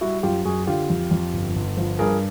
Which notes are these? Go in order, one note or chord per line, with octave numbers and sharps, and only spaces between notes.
G3 E4 F#4
F#2 F4 G4
F#2 F#4 G#4
D3 F4 G4
F2
F2
G1
G1
F3
G2 G#4 A#4